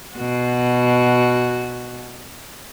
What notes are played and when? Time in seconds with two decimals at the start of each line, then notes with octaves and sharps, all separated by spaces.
0.17 B2 F#4